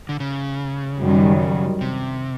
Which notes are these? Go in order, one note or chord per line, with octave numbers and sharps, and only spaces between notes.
D3
C#3
F#2 D#3 G3
C3